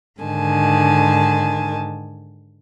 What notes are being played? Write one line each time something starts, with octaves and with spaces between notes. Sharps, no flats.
G#2 D3 D#3 G#5 A5